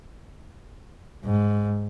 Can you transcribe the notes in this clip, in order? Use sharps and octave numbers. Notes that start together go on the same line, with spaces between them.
G#2